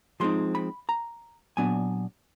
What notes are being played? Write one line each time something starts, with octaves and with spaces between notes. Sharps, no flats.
F3 G#3 C4 D#4 C6
B5
A#5
A#2 F#3 B3 D4 G#5